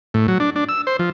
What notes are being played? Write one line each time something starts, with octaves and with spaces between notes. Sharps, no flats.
A2
F#3
D4
D4
E6
C5
F3